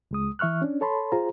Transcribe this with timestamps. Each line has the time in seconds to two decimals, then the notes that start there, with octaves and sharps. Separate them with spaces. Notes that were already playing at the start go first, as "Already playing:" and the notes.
0.11 C#2 G#3 D#6
0.39 E3 E5 C#6 F6 F#6
0.62 C#4 D4
0.81 A4 C#5 A5 B5 C6
1.12 F4 G#4 C5 A#5